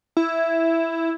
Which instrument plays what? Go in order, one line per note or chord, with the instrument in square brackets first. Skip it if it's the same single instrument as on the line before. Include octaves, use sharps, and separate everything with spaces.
[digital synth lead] E4